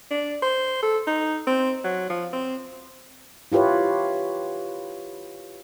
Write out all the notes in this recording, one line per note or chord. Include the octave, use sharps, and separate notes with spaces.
D4
C5
A4
D#4
C4
F#3
F3
C4
E4 F4 G4 B4 C#5